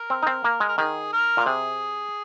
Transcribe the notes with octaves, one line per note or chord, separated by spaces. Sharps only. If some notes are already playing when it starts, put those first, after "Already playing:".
Already playing: A#4
C4
D#4
C4
A#3
G#3
A#4
D#3 G#4
A#4
A#2 F4
C3 G#4